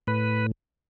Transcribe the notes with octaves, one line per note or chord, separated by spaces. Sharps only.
A2 B4